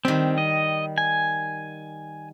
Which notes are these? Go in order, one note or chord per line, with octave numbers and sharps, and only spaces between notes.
D#3 G3 C4
D#5
G#5